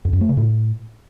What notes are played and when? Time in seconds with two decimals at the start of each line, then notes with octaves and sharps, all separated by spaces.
0.05 F2
0.13 F#2
0.21 A3
0.29 C#3
0.37 A2